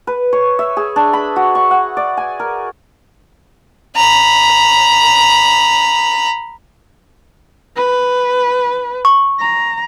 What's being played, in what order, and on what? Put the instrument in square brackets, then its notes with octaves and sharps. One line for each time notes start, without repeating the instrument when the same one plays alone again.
[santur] B4
C#5
E5
G#4
D4
B5
F#4
C#6
F#5
D5
G#5
A#4
[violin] A#5 B5
[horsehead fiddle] B4
[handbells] C#6
[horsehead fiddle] A#5